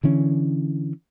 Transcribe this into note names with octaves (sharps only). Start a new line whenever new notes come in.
D3 E3 C#4